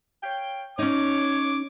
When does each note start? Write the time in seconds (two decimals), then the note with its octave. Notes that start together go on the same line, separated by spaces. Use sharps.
0.23 C#5 F5 G5
0.79 C#4 D#4 C#5 D6